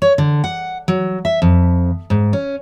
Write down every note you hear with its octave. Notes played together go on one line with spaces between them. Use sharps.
C#5
D3
F#5
F#3
E5
F2
G#2
C#4